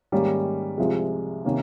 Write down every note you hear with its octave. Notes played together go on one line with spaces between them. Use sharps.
G#2 D#3 G3 A#3 C#4
C2 C3 F3 G#3
C3 D#3 A#3 C#4